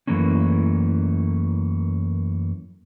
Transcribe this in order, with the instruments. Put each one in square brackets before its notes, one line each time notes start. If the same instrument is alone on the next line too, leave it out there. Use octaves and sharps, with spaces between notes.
[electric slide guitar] F#2 A#2 E3 A3 A#3 C#4